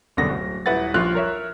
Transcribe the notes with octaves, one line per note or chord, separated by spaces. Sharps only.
F#1 C2 B2 D3 D4 A#6
D1
D#1 E4 B4 F#5 A6
D#1 A#1 F4 F6 F#6
A#4 C#5 E5